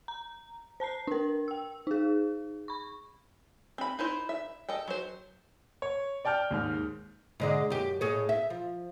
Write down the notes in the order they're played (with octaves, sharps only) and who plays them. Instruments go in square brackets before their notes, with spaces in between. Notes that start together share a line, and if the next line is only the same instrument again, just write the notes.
[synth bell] A#5
C5 A5 A#5 C7
D4 A#4
G5 E6
D#4 G#4
B5 C#6
[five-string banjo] C4 B5
D#4 E4 C5
E5
A4 D#5 G5
F#3 C5
[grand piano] C#5
D5 G5 A5 F6 G6
D#2 G#2 F6
[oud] G#2 D3 G#3
F#2 G4
A2 G#4 C#5
E5
F3